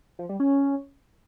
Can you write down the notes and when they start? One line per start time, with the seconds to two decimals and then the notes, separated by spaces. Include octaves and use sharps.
0.19 F3
0.29 G3
0.40 C#4